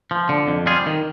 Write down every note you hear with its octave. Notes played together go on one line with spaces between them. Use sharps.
F3
D3
F2
G3 F4 G#4
D#3